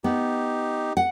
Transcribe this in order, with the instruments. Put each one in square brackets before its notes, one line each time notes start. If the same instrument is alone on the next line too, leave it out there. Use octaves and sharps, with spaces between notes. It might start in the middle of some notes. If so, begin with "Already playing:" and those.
[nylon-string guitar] B3 [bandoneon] D#4 G4
[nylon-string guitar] F#5